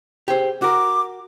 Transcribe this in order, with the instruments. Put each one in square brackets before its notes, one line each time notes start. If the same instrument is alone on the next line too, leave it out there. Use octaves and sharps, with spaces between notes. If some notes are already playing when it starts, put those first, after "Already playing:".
[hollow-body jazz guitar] G4 G#4 C5
[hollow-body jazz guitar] F#4 A#4 [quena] D6